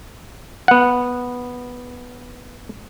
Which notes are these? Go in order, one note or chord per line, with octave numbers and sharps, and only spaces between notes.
B3 F#5